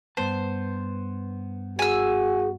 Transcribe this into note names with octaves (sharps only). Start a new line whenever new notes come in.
G2 B3 C5 A5
F#4 G#4 G#5 E6